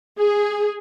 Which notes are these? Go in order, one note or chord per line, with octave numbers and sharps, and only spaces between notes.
G#4